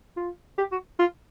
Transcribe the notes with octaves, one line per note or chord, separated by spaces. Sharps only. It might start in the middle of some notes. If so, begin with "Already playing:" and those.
F4
G4
F#4
F4